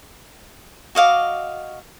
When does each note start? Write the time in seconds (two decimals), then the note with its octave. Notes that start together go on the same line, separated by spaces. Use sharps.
0.95 F#4 D#5 F5 D6